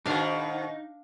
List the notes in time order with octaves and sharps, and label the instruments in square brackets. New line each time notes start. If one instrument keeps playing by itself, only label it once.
[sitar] G#2 B2 D#3 [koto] D4 F5 [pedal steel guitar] D#4